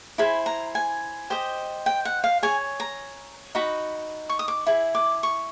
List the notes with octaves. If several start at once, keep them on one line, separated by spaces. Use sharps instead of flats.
E4 G#4 C5 B5
A#5
G#5
G4 C5 D#5
G5
F#5
F5
G#4 C#5 G#5
A#5
D#4 F#4 B5
C#6
D#6
D6
E4 G#4
D6
C#6